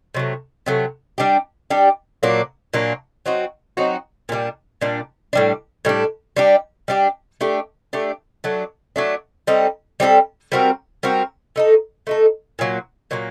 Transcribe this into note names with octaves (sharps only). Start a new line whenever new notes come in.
C3 F#3 A3
C3 F#3 A3
G3 D4 G4
G3 D4 G4
A#2 F#3 A#3 D4
A#2 F#3 A#3 D4
F#3 C4 D#4 F#4
F#3 C4 D#4 F#4
A#2 G3 D4
A#2 G3 D4
A2 G3 D4
A2 G3 D4
G3 D4 G4
G3 D4 G4
A3 D4 G4
A3 D4 G4
F#3 A3 D4
F#3 A3 D4
G3 C4 D#4 A4
G3 C4 D#4 A4
G3 C4 F#4 A#4
G3 C4 F#4 A#4
A3 D#4 A4
A3 D#4 A4
A#2 F#3 A#3
A#2 F#3 A#3